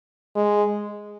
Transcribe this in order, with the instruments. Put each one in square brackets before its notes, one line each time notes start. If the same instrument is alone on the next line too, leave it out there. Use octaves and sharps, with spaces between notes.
[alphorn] G#3